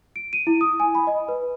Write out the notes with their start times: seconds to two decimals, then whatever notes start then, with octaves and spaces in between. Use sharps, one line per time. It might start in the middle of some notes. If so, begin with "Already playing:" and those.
0.16 D7
0.33 D#7
0.47 E4
0.61 D#6
0.80 G#5
0.95 B5
1.07 D#5
1.28 B4